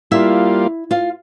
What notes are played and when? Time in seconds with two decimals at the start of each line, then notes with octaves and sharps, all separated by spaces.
0.11 G3 A#3 E4 F4 E5
0.91 F4 F5